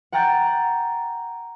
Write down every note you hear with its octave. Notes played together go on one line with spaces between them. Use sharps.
F#5 G5 A#5 F#6 A6